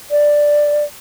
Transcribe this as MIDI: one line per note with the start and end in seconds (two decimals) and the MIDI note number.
0.11 0.84 74